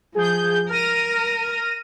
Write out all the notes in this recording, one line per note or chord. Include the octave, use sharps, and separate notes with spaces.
F3 G#4 G6
A#4 F6 A#6 D#7